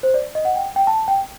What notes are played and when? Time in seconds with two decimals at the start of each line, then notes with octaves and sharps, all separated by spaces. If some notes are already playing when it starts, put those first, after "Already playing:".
0.03 C5
0.14 D5
0.35 D#5
0.45 F#5
0.56 G5
0.76 G5
0.87 A5
1.08 G5